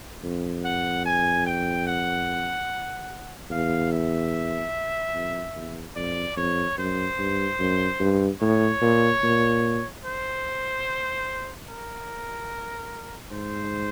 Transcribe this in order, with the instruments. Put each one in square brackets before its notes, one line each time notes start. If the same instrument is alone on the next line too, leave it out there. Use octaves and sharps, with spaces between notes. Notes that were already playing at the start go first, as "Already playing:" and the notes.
[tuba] F2
[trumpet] F#5
G#5
G5
F#5
[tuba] E2 [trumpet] F5
[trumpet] E5
[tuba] F2
E2
[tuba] F2 [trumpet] D5
[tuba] F2 [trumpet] C#5
[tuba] F#2 [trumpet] C5
[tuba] G2
F#2
G2
[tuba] A2 [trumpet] C#5
[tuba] A#2
A#2
[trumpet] C5
A#4
[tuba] G#2 [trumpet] C5